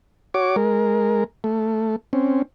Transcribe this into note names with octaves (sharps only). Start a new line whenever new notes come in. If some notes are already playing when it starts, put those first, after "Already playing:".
F#4 C#5 D6
G#3 A#4
A3
C4 C#4